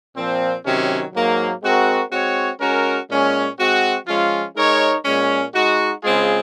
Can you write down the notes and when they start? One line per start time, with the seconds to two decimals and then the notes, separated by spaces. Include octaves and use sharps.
0.15 A#2 F3 C4
0.65 C3 D#3 F#3 C#4
1.13 G#2 F#3 A#3
1.62 G#3 C4 F#4 A#4
2.11 G#3 C4 F#4 C#5
2.60 G#3 C#4 F#4 A#4
3.09 A#2 G#3 C#4
3.58 G#3 C4 F#4
4.07 F3 G#3 C#4 F4
4.55 G#3 D#4 A#4 C#5
5.04 A#2 G#3 C#4
5.53 G#3 D#4 F#4
6.03 C#3 G#3 C4 F4 G#4